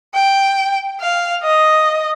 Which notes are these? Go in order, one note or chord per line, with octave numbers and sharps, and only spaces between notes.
G5
F5
D#5